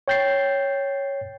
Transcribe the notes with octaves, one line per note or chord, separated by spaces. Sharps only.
C#5 G5 G6 A6 C7